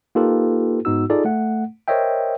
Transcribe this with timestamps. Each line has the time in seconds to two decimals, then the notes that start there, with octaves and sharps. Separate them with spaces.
0.15 A#3 D#4 F4 G4 A4 B4
0.85 G#2 B3 D#4 F#4 E6
1.10 D#4 F4 G#4 A4 D5
1.25 A3 F#5
1.88 A#4 C5 C#5 D#5 E5 G5